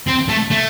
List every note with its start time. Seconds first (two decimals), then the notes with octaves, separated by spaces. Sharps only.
0.08 C4
0.29 A3
0.51 A3